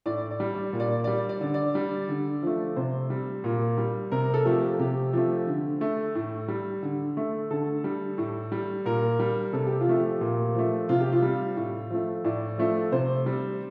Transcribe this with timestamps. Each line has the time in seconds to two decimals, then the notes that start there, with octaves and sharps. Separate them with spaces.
0.06 A2 D5
0.31 D5
0.40 G3
0.55 D5
0.73 A#2
0.80 D5
1.04 G3 D5
1.29 D5
1.41 D3
1.54 D5
1.75 G3
2.09 D3
2.43 F3 A3
2.76 C3 C5
3.10 G3
3.44 A#2
3.78 G3
4.12 C3 A#4
4.34 A4
4.45 F3 A3 G4
4.79 C3 G4
5.13 F3 A3
5.47 D3
5.81 A3
6.15 A2
6.48 G3
6.83 D3
7.17 A3
7.50 D3 A4
7.84 G3
8.18 A2
8.52 G3
8.85 A#2 A#4
9.19 G3
9.53 C3 A4
9.67 G4
9.81 F4
9.87 F3 A3
9.95 G4
10.21 A#2
10.55 F3 A3
10.89 C3 F4
11.00 G4
11.12 F4
11.22 G3
11.56 A2
11.90 F3 A3
12.24 A2 D5
12.58 F3 A3
12.92 C3 C5
13.26 G3